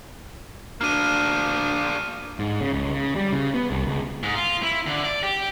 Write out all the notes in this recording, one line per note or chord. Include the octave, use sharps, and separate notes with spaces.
D2 A#3 D4 F6 D#7
G#2
C#3
C#2
C#3
G3
C#3
B3
C2
C#2
G#2
F4
E4
D3
D5
G4